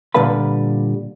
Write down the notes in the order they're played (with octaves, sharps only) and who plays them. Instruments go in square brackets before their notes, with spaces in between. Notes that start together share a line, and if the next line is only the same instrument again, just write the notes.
[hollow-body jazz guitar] A#2 D3 G3 B4 F5 B5